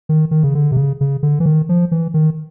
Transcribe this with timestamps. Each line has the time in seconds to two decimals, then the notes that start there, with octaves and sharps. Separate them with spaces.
0.09 D#3
0.31 D#3
0.43 C#3
0.55 D3
0.72 C3
0.77 C#3
1.01 C#3
1.23 D3
1.40 E3
1.46 D#3
1.69 F3
1.92 E3
2.14 D#3